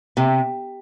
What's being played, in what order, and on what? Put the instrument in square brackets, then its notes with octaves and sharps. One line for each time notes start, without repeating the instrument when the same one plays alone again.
[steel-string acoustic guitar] C3